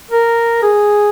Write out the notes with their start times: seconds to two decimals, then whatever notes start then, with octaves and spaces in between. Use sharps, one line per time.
0.11 A#4
0.62 G#4